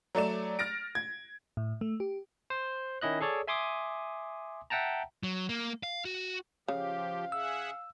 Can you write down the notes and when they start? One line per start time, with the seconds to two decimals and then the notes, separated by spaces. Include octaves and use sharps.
0.15 F#3 A3 D5 E7
0.59 F6 A6 A#6 D7
0.95 G#6
1.57 A2
1.81 A3
2.00 G4
2.50 C5
3.01 D#3 C#4 E4 D#5 F#6
3.20 G#4 A4 C#5 D5
3.47 E5 G#5 C6 D6 D#6
4.70 E5 F#5 G5 A5 A#5
5.23 F#3
5.49 A#3
5.83 F5
6.05 F#4
6.68 C#3 F3 G4 F5
7.32 G#4 E5 F#5 E6